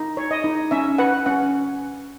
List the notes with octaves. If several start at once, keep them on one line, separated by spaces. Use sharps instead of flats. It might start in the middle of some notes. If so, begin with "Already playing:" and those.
Already playing: D#4
C#5
D#5
D#4
C#4 E5
B4 F#5
C#4 F#5